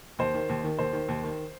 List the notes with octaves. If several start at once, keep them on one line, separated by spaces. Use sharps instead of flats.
D#2 C5
D#3
D#2
D#3
D#2 C5
D#3
D#2
D#3